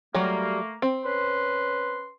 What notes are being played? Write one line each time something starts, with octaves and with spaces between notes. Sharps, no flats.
F#3 G3 A3 A#3
C4
C#4 B4 C6